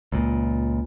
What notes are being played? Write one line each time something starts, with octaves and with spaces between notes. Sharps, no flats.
C#2 A#2